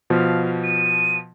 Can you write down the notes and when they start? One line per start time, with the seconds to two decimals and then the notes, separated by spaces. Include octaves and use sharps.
0.10 B2 F3 F5
0.63 D#7